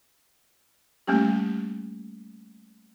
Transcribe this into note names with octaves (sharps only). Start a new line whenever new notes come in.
G3 A3 A#3 C#4 G4